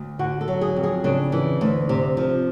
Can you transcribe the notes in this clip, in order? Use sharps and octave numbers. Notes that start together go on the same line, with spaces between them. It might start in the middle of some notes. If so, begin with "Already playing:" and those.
Already playing: D2
D3 F#4
A4
F#3
G#4
F2
G#4
C#3 D4
E3
D2
C3
F3